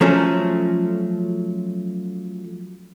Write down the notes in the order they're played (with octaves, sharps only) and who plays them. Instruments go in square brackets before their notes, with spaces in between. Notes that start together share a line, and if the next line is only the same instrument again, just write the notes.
[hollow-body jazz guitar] F3 F#3 A3 C#4